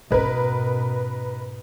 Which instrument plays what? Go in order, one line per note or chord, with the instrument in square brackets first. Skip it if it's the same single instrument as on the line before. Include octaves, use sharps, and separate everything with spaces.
[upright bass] G#2 C#4 [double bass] B2 [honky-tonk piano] A#4 B4 D#5